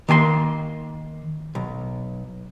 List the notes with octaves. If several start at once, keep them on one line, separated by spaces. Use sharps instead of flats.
D#3 A#3 G#5 C6
B1